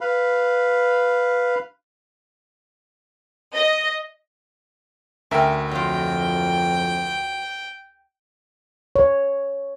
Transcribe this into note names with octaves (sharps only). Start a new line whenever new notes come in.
B4 F5 B5
D#5
D2 C#4 A#4 E5 G5
F2 F#3 F4 G5
C#5